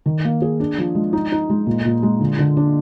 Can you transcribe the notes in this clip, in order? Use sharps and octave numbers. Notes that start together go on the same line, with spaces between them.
D#3
A#3
G#4
D4
F3
G#3
D#4
D#4
G#3
A#2
A#2
G#3
D3
D3
D4